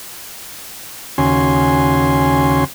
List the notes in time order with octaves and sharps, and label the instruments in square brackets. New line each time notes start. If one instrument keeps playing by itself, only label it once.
[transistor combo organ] D#2 C#3 C#4 F#4 G#5 C6